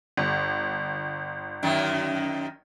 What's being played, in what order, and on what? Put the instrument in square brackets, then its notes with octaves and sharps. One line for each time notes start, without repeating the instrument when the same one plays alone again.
[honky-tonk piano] G1
[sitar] F#2 D#3